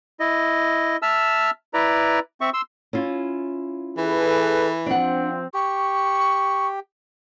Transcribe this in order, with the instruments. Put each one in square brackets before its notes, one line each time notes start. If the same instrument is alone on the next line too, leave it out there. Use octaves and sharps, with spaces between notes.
[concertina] E4 D#5
E5 A5 E6 F6
E4 B4 D5 A#5
C4 E5 C#6
C6 E6
[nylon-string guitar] C#4 E4 F4
[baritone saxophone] E3 [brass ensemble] G#4 A4 B4
[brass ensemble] F3 C4 [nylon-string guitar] D4 F#5
[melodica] G4 [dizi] C#6